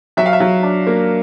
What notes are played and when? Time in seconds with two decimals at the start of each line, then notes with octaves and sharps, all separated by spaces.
0.17 F#3 E5
0.26 F5
0.33 E5
0.40 F#3
0.63 D4
0.87 A#3